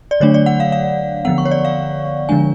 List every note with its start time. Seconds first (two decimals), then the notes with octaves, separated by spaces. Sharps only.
0.11 D5
0.20 D3 F#3 A3 D4 C#5
0.34 D5
0.46 F#5
0.60 F5
0.72 F5
1.25 D3 F3 B3 F#5
1.38 C#6
1.45 C#5
1.51 D5
1.65 F5
2.29 D3 F3 G#3 D4 G#5